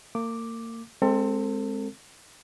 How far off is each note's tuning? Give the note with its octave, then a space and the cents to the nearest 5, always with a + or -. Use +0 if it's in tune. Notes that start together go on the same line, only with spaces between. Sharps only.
A#3 -35 D6 +0
G#3 +0 C4 +5 A4 +35